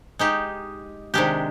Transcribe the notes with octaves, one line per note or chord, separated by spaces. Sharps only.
G#3 D#4 G4
C3 D#3 G#3 D4 G4